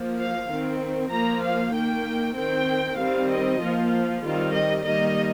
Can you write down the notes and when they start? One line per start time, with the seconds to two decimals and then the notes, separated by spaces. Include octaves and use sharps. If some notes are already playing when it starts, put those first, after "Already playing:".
Already playing: F3 A#3
0.18 F5
0.49 D#3 C4
1.11 F3 A#3 A#5
1.43 F5
1.74 D#3 A#3 G5
2.36 D#3 C4 G5
2.98 D#3 G3 C4 F5
3.31 D#5
3.61 F3 A#3 F4
4.24 D#3 G3 C4 F4
4.56 D#5
4.87 D#3 G3 A#3 D#5